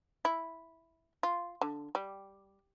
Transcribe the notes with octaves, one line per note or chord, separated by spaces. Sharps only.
E4
F4
D3
G3